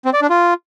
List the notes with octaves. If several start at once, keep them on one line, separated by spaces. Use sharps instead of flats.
C4
D5
D4
F4